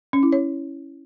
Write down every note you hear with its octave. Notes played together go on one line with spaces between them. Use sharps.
C#4
E4
C#5